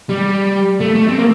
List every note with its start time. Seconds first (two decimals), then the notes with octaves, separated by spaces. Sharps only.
0.09 G3
0.80 A3
0.95 A3
1.08 C4
1.19 A#3